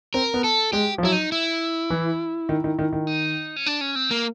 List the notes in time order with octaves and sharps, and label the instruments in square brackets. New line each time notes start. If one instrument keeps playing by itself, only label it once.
[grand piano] C4 [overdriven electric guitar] A#4
[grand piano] B3
[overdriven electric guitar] A4
[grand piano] G#3 [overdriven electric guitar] G4
[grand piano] F3
[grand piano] F#3 [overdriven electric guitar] E4
[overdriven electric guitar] D#4
E4
[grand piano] E3
D#3
D#3
D#3
D#3
[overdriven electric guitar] D#4
C#4
D4
C#4
C4
A#3